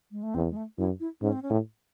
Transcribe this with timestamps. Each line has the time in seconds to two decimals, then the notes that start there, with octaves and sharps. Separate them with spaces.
0.11 G#3
0.23 A3
0.35 E2 C4
0.51 G#3
0.56 A3
0.78 F#2 E4
1.00 E4
1.21 G#2 C#4
1.33 C4
1.42 C#4
1.50 A2